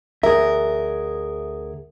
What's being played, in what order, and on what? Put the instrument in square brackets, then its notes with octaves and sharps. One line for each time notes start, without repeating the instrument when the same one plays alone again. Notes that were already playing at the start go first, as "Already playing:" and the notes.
[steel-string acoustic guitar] D2 A#4 [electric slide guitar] G#4 E5